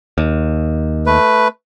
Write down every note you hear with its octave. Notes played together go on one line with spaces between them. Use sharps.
D#2
A3 B4